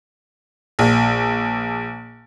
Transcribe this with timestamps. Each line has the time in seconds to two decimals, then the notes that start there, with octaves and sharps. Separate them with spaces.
0.79 A#1